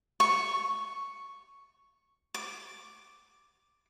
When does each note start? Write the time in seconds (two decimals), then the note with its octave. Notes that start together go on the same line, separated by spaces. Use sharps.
0.20 C#6
2.34 D6